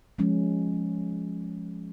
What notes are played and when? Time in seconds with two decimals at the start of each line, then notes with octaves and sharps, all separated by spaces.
0.19 F3 G#3 C#4